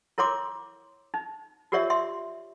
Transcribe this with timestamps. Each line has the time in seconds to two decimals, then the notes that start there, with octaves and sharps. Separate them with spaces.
0.18 E4 A#4 C#5 C6 D6
1.14 D#4
1.72 F4 G4 A#4 C#5 D5 E5
1.90 E5 C6